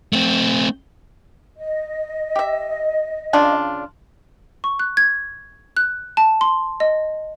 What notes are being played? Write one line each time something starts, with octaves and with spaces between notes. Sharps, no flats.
A3 C4
D#5
G4 E5
C#3 D4 F4
C#6
F#6
G#6
F#6
A5
C6
D#5